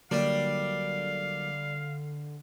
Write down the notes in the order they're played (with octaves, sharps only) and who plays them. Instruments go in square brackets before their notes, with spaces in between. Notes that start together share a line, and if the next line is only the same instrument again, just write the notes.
[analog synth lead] D3 [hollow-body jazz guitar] F#3 A#3 [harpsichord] G3 D4 [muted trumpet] F5